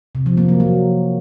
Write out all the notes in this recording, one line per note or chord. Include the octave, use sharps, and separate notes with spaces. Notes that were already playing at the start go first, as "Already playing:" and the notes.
C3
F3
A#3
F#3
F#3